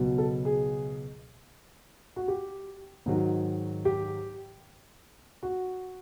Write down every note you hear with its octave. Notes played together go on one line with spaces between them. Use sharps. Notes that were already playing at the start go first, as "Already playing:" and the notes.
Already playing: C#2 B2 F#3
A4
G#4
F#4
G4
G#2 D#3 F#3
G4
F#4